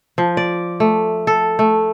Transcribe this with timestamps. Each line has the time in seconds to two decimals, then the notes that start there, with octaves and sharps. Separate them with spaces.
0.18 F3
0.37 D5
0.80 A3
1.27 A4
1.59 A3